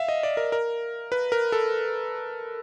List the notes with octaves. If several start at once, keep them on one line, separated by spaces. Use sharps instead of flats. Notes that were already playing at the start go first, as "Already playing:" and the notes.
Already playing: E5 F5
D#5
D5
A#4
A#4
B4
A#4
A4